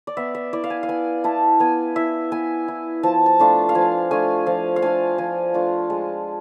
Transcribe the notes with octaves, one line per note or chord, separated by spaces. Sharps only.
D5
B3 E5
E5
E4 D5
F5
G#5
F5
B3 G#5
E4 A5
B3 G#5
E4 E5
B3 G#5
E4
F3 A5
A5
A3 D4 F4
F5
F3 G#5
A3 D4 F4 G#5
F3 F5
F5
A3 D4 F4 G#5
F3 G#5
A3 D4 F4
G#3